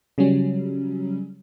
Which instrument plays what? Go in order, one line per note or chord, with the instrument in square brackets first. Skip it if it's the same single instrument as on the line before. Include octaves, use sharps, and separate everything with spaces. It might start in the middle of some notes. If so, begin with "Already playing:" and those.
[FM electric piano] C#3 F#3 G3 C#4